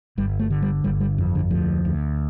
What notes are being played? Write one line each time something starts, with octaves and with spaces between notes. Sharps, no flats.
G1 G3
A3
D3
G3
G1 G3
G3
F2
D3
D2 F3
D2